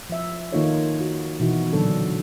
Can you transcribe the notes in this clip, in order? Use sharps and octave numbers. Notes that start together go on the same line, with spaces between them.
F3 E5
D#3 A#3 D#4 F4 A4 C#5
F#4
B2 E3 D#4 E4 F#4
A#2 D3 F#3 D4 A4